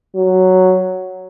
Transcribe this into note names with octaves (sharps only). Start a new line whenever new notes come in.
F#3